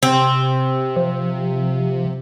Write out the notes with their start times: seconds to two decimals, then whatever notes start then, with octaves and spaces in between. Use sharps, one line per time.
0.03 C3 C4
0.96 F3